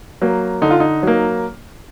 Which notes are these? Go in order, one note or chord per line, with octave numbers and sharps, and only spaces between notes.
F#3 A#3
D3 D#4
F4
D#4
F#3 A#3